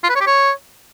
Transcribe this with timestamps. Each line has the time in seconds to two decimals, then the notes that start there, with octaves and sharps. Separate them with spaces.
0.03 F4
0.09 B4
0.15 C#5
0.21 G4
0.27 C#5